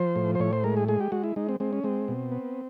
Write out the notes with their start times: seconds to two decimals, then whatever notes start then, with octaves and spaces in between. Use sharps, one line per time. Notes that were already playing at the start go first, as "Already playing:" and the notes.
Already playing: F3 C5
0.16 A2
0.35 C5
0.40 A2 C#5
0.53 C5
0.64 G#3 A#4
0.77 G#4
0.88 G#3 G#4
1.00 G4
1.12 G#3 F#4
1.24 E4
1.36 G#3 D#4
1.49 C4
1.60 G#3 C4
1.73 C#4
1.84 G#3 C4
2.08 B2
2.32 B3